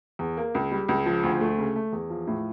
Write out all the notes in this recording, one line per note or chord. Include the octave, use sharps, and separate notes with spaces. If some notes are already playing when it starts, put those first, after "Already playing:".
E2
A#3
C#2
G3
C#2
F3
D2
A3
C#3
A3
E2
F3
A2